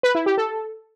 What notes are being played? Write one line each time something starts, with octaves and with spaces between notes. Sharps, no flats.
B4
E4
G4
A4